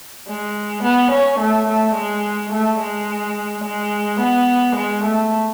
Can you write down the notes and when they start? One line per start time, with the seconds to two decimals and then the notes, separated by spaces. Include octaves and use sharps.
0.28 G#3
0.84 B3
1.12 C#4
1.39 A3
1.68 A3
1.95 G#3
2.52 A3
2.80 G#3
3.64 G#3
4.20 B3
4.76 G#3
5.04 A3